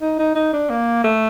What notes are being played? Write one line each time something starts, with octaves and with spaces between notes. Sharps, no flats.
D#4
D#4
D#4
D4
A#3
A3